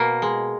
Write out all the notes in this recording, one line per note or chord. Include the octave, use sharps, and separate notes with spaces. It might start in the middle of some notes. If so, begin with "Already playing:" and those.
Already playing: B2 A#3
G#3